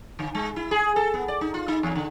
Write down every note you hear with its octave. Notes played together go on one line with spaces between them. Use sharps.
D3
G#3
E4
G#4
A4
B3
D5
D#4
F4
D#4
E2
D3